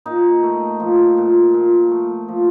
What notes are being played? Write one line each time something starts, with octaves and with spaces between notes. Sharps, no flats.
A#2 D#4
A3
F3
A#2
A#2
A3
F3